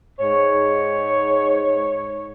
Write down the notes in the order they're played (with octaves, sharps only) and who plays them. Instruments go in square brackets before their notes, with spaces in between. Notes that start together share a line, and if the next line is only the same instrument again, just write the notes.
[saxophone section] G#2 C#5